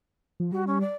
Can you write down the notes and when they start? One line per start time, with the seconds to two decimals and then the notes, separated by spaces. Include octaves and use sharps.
0.40 F3
0.52 G3 F#4
0.67 C#4
0.81 D5